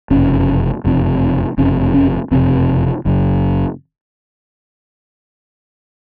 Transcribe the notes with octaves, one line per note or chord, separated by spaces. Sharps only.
F#1 F2 C3 C#4
F#1 F2 C3
F#1 F2 C3 C#4
C#4
F#1 F2 C3 C4
F#1 F#2 C#3